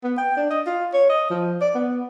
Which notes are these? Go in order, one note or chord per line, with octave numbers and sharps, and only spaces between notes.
B3
G5
D4
D#5
F4
C#5
D#5
F3
D5
B3